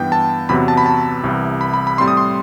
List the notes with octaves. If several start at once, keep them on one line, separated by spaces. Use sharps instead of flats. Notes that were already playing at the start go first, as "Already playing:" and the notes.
Already playing: G2 E3 B3 G5
A5
E2 C3 F#3 B3 B5
A5
B5
A5
C2 C3 E3
B5
B5
B5
A2 G3 C4 C6
D#6
C6